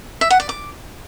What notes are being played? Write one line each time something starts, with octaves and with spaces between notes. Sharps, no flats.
E5
F#5
D5
D6